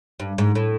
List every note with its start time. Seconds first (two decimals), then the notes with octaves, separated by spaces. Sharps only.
0.20 G2
0.38 G#2
0.55 A2